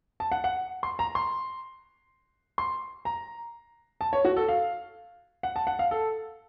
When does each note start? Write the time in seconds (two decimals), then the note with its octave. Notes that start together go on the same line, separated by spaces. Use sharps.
0.20 A5
0.32 F#5
0.44 F#5
0.83 C6
0.99 A#5
1.15 C6
2.58 C6
3.05 A#5
4.01 A5
4.13 C#5
4.25 F#4
4.37 A4
4.48 F5
5.43 F#5
5.56 A5
5.67 F#5
5.79 F5
5.91 A4